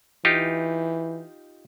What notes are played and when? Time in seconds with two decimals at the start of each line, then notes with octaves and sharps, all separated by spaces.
0.25 E3 D#4 F4 G4